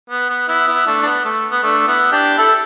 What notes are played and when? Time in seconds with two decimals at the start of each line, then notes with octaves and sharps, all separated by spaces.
0.10 B3
0.30 B3
0.48 B3 E4
0.67 B3 E4
0.87 A3 D4
1.02 D4
1.05 B3
1.25 A3
1.51 B3
1.63 A3 D4
1.87 B3 E4
2.12 D4 G4
2.38 E4 A4